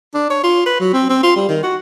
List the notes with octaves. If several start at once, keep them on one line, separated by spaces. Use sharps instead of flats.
D4
C#5
F4
B4
F#3
C4
C4
F4
G3
D#3
F#4